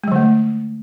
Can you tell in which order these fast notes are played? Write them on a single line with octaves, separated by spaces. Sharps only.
G#3 F#3 D3 A3